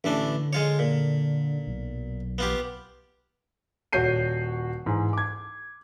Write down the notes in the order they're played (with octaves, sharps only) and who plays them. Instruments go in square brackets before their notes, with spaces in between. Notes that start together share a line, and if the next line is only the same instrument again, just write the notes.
[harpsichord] A1 E3 D4 [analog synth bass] D3
[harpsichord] G#3 F4 C#5
A#2
[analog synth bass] B1
[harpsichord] B3 F4 G4
[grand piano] D#1 F#4 C#5 G6 C7 D#7
G#2 E3
D6 G#6